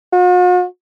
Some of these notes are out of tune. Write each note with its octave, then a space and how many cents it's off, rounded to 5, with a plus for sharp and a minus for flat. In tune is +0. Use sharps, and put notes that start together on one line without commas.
F#4 -45